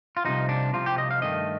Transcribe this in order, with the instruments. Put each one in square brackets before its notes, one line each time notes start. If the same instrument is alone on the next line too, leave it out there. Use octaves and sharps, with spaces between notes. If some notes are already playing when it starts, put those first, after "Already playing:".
[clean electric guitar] F4
C2 C3 F3 D#4
D4
C2 C3 F3 F4
G4
D#5
F5
G2 D#3 A3 D#5